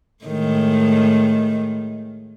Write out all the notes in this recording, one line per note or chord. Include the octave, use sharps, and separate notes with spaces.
A2 D#3 G#3